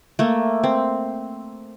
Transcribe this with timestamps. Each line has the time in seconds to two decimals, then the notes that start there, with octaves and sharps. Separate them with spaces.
0.19 A3 A#3
0.64 C4